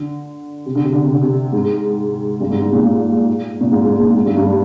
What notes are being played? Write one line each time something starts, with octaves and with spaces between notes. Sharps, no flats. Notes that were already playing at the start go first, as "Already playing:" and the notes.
Already playing: D3
C3
D3
C3
D3
C3
D3
C3
G#2
G2
G#2
G#2
A#2
G#2
A#2
G#2
G#2
A#2
G#2
G2
G2